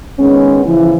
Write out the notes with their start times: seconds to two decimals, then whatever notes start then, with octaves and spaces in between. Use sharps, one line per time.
0.19 D#3 G#3 B3 C#4
0.65 C#3 E3 F3 E4